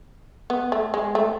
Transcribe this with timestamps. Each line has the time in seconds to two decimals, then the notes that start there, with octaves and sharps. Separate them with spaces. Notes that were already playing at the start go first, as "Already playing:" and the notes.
0.50 B3
0.72 A3
0.94 G#3
1.15 A3